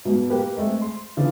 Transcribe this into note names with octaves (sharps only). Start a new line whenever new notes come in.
G#2 B2
A#3 G4 A#4 B4
G#3 A3 C4
C6
C#3 E3 D4 F4